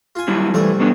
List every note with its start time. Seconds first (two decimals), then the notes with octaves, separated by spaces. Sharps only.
0.15 F4 G#5
0.28 F#3 G3 E4
0.54 C2 E3 F3 A3 D5
0.80 A2 B3 D4